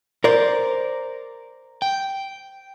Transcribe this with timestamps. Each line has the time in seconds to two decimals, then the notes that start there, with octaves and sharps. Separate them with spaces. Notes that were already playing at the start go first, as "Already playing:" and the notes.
0.24 A#4 C5 D5
1.82 G5